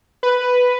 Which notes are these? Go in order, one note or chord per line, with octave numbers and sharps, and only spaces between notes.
B4